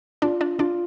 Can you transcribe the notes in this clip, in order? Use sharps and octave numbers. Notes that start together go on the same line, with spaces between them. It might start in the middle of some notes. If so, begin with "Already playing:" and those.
D4 F4 D5
D4 D5
D4 F4 D5